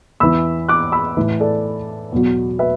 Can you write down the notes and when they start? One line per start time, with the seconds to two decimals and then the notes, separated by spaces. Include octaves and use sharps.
0.20 E2 E3 B5 E6
0.69 D6 F#6
0.92 B5 E6
1.17 A2 E3
1.40 A4 D5
2.12 E2 B2 F#3
2.59 B4 E5